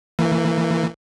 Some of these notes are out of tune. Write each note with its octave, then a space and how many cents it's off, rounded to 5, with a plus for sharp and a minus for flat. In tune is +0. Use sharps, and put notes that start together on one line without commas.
E3 +0 A#3 -35